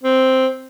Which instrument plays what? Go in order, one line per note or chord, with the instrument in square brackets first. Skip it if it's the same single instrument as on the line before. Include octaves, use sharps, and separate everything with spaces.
[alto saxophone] C4